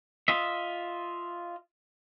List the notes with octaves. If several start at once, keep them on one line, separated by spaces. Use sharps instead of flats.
F4 D#5 E5